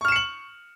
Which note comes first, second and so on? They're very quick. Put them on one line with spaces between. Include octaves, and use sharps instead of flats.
C#6 F6 E7 C#7 F#7